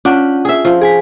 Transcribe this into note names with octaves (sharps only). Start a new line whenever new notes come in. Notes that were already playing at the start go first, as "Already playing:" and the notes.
C#4 D4 F4 F#5
G#4 E5
F3
G#4 G#5 B6